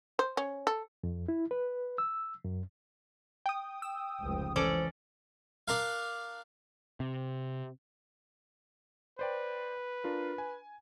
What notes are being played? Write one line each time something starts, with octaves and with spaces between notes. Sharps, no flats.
C5
C#4
A4
F2
E4
B4
E6
F#2
G5 D#6
E6
F1 C#2 F3
E3 C#4 A4 C5 D5
D4 A#4 F5
C3
B4 C5 D5 G5
D4 F4 A#4
G#5